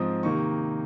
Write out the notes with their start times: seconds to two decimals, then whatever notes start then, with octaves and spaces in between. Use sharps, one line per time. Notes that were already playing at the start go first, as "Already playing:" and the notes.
Already playing: G#2 F3 C4 D#6
0.23 C3 D#3 A#3 D#4 C#6